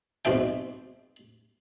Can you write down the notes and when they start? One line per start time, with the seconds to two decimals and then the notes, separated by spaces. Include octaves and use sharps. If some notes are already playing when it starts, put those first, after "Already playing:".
0.25 B1 F2 G#2 C4 E5 G5